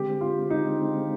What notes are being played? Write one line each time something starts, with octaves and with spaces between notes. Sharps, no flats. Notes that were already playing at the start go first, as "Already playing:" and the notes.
Already playing: D3 G#3 C4 G4
F4
D#4